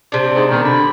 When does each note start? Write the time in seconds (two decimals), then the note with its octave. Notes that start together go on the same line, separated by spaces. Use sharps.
0.12 C3 D4
0.35 G#2
0.50 B2 D#3
0.64 D3 B5